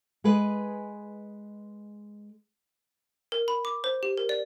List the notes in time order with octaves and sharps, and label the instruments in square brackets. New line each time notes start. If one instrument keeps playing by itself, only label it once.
[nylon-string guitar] G#3 G#4 B4 D#5
[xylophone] A#4
B5
D6
C5
G4
A#4
D5